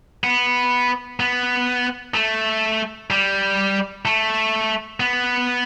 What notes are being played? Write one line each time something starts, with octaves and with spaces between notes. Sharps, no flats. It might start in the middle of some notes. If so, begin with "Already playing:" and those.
B3
B3
A3
G3
A3
B3